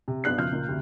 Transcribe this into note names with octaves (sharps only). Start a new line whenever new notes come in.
C3
B1 B3 D4 F#6 C7
F#1 B1 F3 F6 G6
C#2 A#2
D2 C3